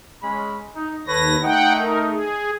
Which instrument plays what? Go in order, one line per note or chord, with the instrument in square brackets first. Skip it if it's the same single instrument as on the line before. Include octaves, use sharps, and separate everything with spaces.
[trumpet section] G#3 C#4 B5
D#4
[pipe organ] D#2 A#6 [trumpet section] A4 B4 C#5
[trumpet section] A3 D#4 [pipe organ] F#5 G5
[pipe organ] A#4
G#4